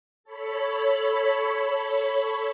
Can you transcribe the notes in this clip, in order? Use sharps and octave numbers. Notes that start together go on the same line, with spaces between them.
A4 C#5 B5